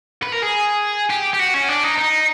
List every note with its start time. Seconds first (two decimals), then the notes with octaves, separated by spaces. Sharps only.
0.23 B4
0.32 A#4
0.42 G#4
1.10 G4
1.34 G4
1.40 F#4
1.54 C#4
1.69 D4
1.83 D#4
1.98 D#4